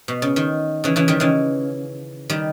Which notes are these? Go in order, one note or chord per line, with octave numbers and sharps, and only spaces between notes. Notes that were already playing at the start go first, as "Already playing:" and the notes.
B2
C#3
D#3
C#3 E3
C#3 E3
D#3 G3
C#3 E3
D#3 G3